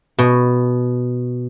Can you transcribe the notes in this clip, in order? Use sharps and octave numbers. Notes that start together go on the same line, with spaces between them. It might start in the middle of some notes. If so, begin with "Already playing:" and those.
B2